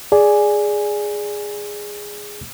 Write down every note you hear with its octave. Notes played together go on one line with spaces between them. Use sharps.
G#4 D5 G#5